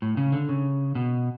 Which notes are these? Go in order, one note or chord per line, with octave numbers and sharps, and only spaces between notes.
A2
C#3
D3
C#3
B2